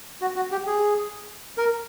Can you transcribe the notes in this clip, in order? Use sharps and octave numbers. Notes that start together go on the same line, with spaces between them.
F#4
F#4
G4
G#4
A#4